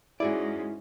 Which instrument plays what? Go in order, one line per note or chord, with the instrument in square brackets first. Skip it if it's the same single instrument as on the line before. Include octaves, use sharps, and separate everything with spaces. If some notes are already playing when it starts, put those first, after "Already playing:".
[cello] G#2 C#4 [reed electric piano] E4 [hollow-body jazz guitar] F#4 G#4 D5